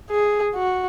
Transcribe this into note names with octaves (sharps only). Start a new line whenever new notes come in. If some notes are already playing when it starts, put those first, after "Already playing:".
G#4
F#4